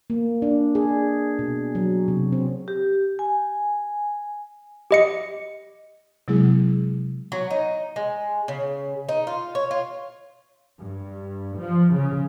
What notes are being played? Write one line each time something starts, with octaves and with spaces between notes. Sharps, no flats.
A#3
D4
G#4
B2
F#3
C3
C4
G4
G#5
G4 D#5 C#7
C3 F#3 G#3 B3 E4 G#4
F#3
D#4
G#3
C#3
D#4
F4
C#5
F4
G2
F3
C#3